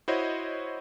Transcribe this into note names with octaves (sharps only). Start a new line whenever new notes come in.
E4 F#4 C5 C#5 D#5